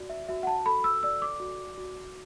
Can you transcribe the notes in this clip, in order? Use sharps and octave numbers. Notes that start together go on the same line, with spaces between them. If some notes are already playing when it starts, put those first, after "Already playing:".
Already playing: F#4 D5
E5
F#4 E5
F#5
A5
A4 B5
E6
D5 E6
D6
F#4
F#4